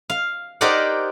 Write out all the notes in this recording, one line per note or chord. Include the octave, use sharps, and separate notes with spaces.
F5
D#4 G4 A#4 C5 D5 F#5